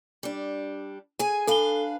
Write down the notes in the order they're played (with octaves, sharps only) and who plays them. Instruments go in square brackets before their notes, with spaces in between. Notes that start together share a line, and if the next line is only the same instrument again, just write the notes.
[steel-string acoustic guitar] G3 D4
G#4 G#5
[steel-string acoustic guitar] D4 B4 F5 [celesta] A4 G7